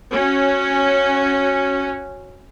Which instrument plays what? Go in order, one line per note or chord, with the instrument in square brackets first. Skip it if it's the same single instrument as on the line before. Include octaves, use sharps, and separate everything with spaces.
[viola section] C#4 F#4